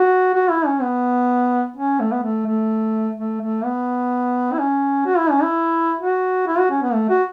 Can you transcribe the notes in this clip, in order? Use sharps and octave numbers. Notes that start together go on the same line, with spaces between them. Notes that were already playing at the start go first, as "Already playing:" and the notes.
Already playing: F#4
F#4
E4
C#4
B3
C#4
A3
B3
A3
A3
A3
A3
B3
E4
C#4
F#4
E4
C#4
E4
F#4
E4
F#4
C#4
B3
A3
F#4